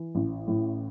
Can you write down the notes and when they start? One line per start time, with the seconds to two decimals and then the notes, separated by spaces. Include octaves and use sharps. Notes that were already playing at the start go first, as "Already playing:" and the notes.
Already playing: E3
0.15 A1
0.48 A2